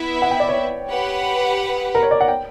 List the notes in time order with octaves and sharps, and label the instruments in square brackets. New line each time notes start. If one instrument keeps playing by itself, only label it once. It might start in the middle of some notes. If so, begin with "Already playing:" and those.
Already playing: [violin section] B3 E4 B4 E5
[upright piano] F#5
G5
D5
C#5
[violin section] G4 B4 F#5
[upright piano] A#4
C#5
D5
F#5
G5